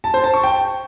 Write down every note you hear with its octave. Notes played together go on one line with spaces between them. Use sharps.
A5
C5
A5
C#6
G5